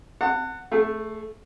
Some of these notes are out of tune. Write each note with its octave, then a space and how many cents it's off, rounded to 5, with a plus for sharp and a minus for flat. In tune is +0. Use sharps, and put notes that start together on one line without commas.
F#5 +0 A5 +40
A3 +0 G#4 +25